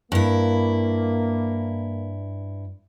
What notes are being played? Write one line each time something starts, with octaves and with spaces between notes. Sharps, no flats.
G2 A#3 E4